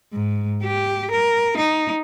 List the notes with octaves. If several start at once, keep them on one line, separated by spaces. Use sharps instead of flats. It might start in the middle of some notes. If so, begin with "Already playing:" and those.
G#2
G4
A#4
D#4